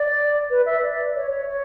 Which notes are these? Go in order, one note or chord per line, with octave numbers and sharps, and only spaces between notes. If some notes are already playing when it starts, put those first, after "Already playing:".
Already playing: D5
B4
E5
D5
C#5
C#5
C#5